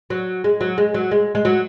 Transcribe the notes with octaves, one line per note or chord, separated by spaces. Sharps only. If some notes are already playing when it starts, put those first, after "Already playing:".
F#3
G#3
F#3
G#3
F#3
G#3
G#3
F#3